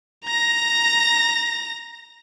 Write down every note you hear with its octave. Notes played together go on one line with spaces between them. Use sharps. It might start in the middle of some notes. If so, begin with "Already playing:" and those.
A#5 A#6